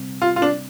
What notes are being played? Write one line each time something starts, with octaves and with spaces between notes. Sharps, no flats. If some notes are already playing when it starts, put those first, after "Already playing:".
Already playing: C3 G3 C4
F4
F4
D4